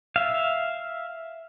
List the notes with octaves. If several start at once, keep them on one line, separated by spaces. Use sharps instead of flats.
E5 F5